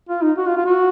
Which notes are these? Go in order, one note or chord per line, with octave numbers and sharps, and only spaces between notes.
F4
D#4
F#4
F4
F4
F#4